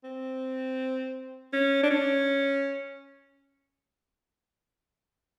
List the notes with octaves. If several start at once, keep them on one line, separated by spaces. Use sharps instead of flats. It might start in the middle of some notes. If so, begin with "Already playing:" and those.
C4
C#4
D4
C#4